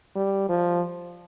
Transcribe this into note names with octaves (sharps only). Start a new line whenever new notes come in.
G3
F3